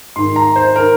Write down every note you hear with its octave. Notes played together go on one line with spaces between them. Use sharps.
G#2 D#3 C6
A#5
C5
D#3 A#4